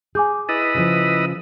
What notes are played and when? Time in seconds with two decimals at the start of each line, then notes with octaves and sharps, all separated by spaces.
0.15 G#4 G#5 D6 G6
0.49 E4 B4 D#5 A6
0.75 C#3 F3